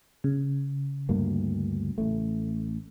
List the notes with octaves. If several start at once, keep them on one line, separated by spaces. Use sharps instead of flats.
C#3
D2 G2 A#3
A1 A3